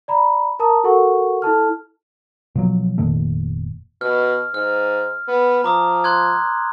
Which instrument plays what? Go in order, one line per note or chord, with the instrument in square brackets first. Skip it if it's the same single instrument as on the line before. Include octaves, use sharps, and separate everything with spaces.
[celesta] D5 A#5 B5
A#4 A5 A#5 D#6
F#4 A4 A#4 F#5 C#6
E4 A4 A5 F6
[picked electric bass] B2 F3 F#3
F1 A#2 D#3 A3
[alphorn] B2 [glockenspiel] F6
[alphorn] G#2 [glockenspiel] F6
[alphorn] B3
[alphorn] F3 [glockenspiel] A#5 D6 D#6
[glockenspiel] C6 F#6 G#6